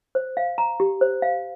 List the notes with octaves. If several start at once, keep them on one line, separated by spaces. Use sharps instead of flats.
C5
F5
A#5
G4
C5
F5